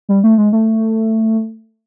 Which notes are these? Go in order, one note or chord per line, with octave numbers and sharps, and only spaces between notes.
G3
A3
G#3
A3